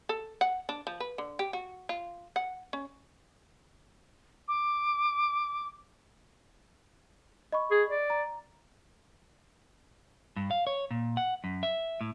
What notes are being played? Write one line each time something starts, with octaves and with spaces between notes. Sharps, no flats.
A4
F#5
D4
F3
B4
D3
G4
F#4
F4
F#5
C#4
D6
D#5 B5 C#6
G#4
D5
A#5
G2
F5
C#5
A#2
F#5
F#2
E5
A2